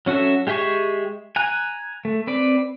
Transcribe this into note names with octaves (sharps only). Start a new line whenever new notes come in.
F#3 C#4 F#4 A4 E5
G#3 G4 G#4 E5 C#6
G#5 A#5 F#6
A3
C4 B4 D5